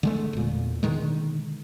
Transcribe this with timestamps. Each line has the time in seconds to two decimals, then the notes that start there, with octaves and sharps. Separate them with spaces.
0.03 D3 G#3 A3
0.33 E1 A#2
0.83 B2 D3 D#3 G#3